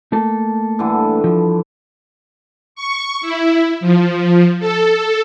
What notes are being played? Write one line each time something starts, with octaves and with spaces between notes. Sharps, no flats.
A3 A#3 A4
G2 D3 E3
F3
C#6
E4
F3
A4